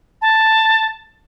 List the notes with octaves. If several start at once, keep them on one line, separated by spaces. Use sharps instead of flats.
A5